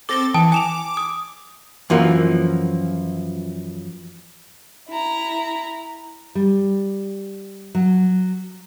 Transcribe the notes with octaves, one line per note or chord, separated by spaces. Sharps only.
C4 A4 D6 A6 A#6 G7
E3 G5 A5 D#6
G#5 D6 E7 F7
D#6
F#2 E3 F3 A#3
E4 A#5
G3
F#3